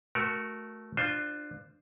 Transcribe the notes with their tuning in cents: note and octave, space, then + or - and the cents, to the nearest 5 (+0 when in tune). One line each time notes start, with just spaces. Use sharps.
A3 -10 F#4 +0 A#4 +10
D4 +20 F4 +0 C5 +0